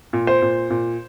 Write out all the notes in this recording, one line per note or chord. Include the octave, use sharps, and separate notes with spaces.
A#2
C5
A#2
A#2